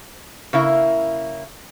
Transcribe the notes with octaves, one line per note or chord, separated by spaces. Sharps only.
C#3 A#3 E4